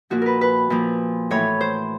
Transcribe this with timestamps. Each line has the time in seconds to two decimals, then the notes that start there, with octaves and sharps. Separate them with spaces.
0.10 A#2 F3 F#4
0.22 A#4 B4
0.41 B4
0.70 A#2 F3
1.31 A2 E3 C#5
1.61 C5